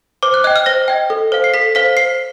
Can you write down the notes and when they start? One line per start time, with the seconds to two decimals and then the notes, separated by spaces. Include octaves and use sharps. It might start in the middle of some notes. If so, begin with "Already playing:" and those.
0.23 C5 D6
0.34 F#6
0.44 D#5 G5 F#6
0.56 F6
0.66 C5 A#6
0.88 D#5 G5
1.10 A4
1.32 C5 F5
1.44 C7
1.54 A4 B6
1.75 C5 F5 B6
1.97 C5 C7